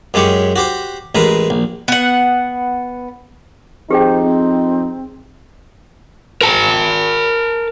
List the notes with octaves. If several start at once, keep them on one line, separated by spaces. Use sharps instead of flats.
F#2 G#3 C#4 G4 C#6
F#4 G4 C5
A1 G#3 A#4 B4
A#1
B3 F#5
F2 D#4 G4 G#4 C5 G5
C4
A#4 A5